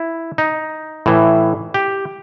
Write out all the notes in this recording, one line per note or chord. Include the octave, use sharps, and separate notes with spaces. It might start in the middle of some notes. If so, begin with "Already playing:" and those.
Already playing: E4
D#4
A2 E3
G4